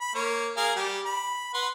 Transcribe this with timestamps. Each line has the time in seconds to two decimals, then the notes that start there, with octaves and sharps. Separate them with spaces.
0.01 B5
0.15 A#3 C#5
0.57 G#4 A#4 F5
0.76 G3 G4
1.06 B5
1.54 B4 F#5 C6